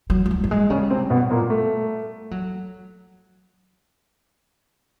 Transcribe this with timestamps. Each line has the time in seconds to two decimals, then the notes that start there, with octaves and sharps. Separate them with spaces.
0.10 F#3
0.26 F#3
0.31 G3
0.44 G3
0.51 G#3
0.70 C#3 G3 C#4
0.90 C3 C4
1.10 B2 B3
1.30 A#2 A#3
1.50 A3
2.31 F#3